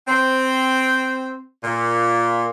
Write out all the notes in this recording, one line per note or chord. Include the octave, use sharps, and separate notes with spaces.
C4
A#2